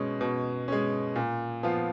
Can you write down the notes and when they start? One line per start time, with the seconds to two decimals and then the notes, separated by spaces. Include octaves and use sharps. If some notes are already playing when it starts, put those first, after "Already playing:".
Already playing: B2 G#3 C#4
0.21 B2
0.68 G#3 C#4
1.16 A#2
1.63 F3 B3 F4